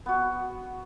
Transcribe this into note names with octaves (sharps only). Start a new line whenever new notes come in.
B3 F#4